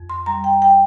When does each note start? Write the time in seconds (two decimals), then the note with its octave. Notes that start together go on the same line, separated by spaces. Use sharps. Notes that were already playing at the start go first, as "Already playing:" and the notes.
Already playing: F2
0.10 C6
0.26 G3 A#5
0.44 G5
0.62 G5